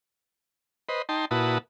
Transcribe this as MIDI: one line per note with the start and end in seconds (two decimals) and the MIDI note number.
0.89 1.02 71
0.89 1.02 72
0.89 1.02 75
1.09 1.25 63
1.09 1.25 79
1.09 1.25 81
1.09 1.25 84
1.31 1.58 46
1.31 1.58 64
1.31 1.58 66
1.31 1.58 71
1.31 1.58 81
1.31 1.58 87